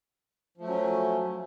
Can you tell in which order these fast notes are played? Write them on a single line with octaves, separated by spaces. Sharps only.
F3 A3 F#3 C#4